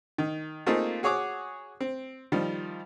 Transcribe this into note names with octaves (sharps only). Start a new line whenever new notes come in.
D#3
A3 A#3 C4 D#4 F4 G#4
F#4 G#4 C#5 F#5 D6
C4
D#3 F3 G3